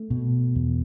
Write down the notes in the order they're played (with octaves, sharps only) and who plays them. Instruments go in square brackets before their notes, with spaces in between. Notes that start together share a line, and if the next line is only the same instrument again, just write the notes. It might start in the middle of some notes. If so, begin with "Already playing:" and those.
Already playing: [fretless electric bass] A3
B2
E2